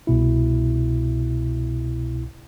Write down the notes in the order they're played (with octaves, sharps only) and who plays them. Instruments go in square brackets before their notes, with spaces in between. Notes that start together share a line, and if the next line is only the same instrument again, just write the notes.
[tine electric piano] C2 B2 E4